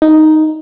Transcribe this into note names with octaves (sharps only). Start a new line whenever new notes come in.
D#4